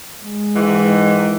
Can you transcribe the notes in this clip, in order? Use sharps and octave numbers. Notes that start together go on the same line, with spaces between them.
G#3
G#2 D#3 E3